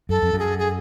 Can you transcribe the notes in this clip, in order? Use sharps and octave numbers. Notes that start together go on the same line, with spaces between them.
F#2 A4
F2
F#2
G#4
G#4